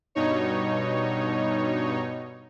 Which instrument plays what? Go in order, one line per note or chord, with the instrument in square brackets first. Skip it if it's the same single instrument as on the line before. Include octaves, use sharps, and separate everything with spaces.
[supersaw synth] G2 B2 D#4 C#5